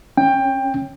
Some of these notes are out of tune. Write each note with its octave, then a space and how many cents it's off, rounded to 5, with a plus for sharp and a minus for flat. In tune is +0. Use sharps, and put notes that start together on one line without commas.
C#4 -5 G5 +20